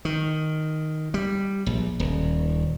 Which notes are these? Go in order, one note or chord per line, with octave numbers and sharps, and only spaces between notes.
D#3
G3
A#1
D#1